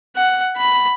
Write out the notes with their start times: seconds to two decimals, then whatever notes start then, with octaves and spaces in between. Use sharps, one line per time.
0.16 F#5
0.57 B5